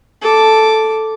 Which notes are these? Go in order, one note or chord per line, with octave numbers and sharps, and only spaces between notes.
A4 D6